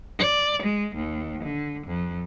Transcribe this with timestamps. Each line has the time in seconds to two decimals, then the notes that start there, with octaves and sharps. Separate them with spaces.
0.18 D5
0.62 G#3
0.95 D#2
1.44 D3
1.87 F2